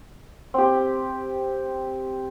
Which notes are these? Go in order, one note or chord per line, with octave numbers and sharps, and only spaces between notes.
C4 G4